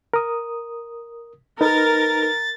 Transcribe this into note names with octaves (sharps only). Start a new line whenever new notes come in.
A#4 D#6
D#4 A#4 B4 A6